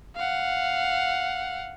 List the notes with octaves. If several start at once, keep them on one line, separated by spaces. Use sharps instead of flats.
F5 F#5